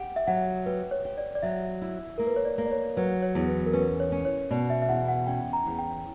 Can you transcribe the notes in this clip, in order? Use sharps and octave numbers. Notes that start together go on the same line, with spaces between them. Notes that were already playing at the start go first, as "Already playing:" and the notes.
Already playing: G4 F#5
E5
F#3 F#5
G4 B4
C#5
G4
D5
D5
F#3 E5
E4
A#3 A#4
B4
C#5
D5
A#3
D5
C#5
F#3 B4
C#5
E2
B4
A#4
C#4 B4
C#5
C#4
C#5
B2 D5
E5
E5
E2 F#5
F#5
C#4 G5
A#5
E2
G5